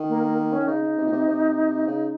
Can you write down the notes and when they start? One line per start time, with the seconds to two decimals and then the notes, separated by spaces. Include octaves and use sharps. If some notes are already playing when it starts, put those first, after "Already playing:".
Already playing: D#3
0.09 A#3
0.23 A#3
0.38 A#3
0.52 C#4
0.60 D#3
0.68 C#3 D#4
0.83 C#3
0.97 C3
1.07 A#2
1.12 C3
1.28 C3
1.87 C#3